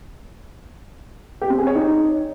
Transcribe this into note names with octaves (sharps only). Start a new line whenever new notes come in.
G4
C4
G#4
C#5
D#4